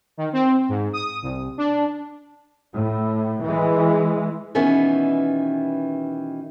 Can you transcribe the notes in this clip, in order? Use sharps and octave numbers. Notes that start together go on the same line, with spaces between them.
D#3
C4
G#2
D#6
C2
D4
A2
E3 G#3
B2 D#3 E3 B3 C#4